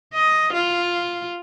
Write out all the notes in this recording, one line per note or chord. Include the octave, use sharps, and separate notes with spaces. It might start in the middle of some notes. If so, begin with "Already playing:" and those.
D#5
F4